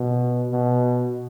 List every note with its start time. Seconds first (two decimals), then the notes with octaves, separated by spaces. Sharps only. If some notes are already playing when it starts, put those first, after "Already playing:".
Already playing: B2
0.51 B2